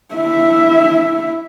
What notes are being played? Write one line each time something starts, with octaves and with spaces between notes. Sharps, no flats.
E4 E5